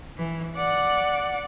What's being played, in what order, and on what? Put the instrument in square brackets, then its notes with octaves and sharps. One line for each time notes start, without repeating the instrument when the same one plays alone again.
[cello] E3
D5 F#5